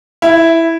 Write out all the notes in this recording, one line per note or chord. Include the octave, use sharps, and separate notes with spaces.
E4